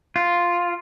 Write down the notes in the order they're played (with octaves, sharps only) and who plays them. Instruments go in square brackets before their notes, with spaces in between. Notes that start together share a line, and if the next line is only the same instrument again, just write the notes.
[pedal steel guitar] F4